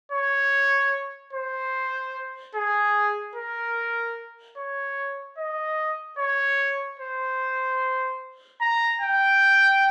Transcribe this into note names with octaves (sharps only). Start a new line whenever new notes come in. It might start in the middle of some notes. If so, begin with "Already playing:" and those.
C#5
C5
G#4
A#4
C#5
D#5
C#5
C5
A#5
G5